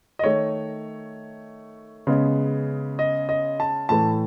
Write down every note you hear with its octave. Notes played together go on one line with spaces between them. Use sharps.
D#5
D#3 A3 C#5
C#3 G#3 B3
D#5
D#5
A5
A2 E3 A3 A5